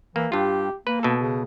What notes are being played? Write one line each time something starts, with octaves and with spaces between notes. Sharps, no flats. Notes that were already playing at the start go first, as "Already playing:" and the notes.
E3 A#3
G2 F4 G4
A#3 B4
B2 A4
C#3